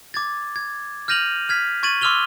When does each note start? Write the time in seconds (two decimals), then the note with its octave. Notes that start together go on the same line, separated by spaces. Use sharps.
0.14 D6 G#6 A6
0.56 G#6
1.08 F6 G6 A#6 D#7 F7 F#7
1.49 F6 G#6 B6
1.83 C#6 G#6 A6 D#7 F#7
2.01 C6 D6 E6 F6 F7 G7